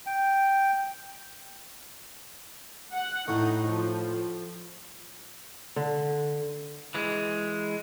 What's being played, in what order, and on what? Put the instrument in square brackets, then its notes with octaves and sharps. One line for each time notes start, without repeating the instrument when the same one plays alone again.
[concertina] G5
[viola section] F#5
[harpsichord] A2 [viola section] D#4
[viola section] F3
[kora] D3
[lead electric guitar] E3 G#3